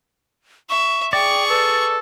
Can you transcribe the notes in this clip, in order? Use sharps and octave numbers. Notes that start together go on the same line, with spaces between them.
E5 C#6
G#4 D5 G5 C#6
A4 B4